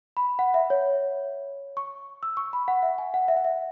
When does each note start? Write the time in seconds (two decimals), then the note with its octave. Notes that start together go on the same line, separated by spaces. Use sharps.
0.17 B5
0.39 F#5
0.54 E5
0.70 C#5
1.77 C#6
2.23 E6
2.37 C#6
2.53 B5
2.68 F#5
2.83 E5
2.98 G#5
3.14 F#5
3.28 E5
3.37 F#5
3.44 E5